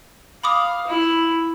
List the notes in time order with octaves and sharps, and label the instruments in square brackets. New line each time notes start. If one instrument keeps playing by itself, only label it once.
[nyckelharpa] F5 [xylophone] B5 D6 D#6
[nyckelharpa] E4